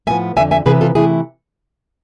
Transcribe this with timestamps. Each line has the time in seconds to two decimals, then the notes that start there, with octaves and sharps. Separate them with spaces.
0.07 A2 F3 B3 E5 G#5
0.36 F2 D3 F3 E5 G#5
0.51 E5 G#5
0.66 C3 E3 B3 E4 G#4 B4
0.81 F4 A4
0.95 C3 E3 A3 E4 G#4